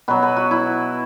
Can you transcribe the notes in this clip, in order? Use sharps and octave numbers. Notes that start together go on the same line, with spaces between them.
B2 F#3 B4
B4
F#4
E4